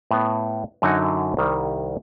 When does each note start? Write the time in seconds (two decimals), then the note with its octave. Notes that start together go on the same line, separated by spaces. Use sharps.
0.11 A2 B3
0.82 F#2 D3 F#3 D#4 F#4 G#5
1.37 C2 D#3 G3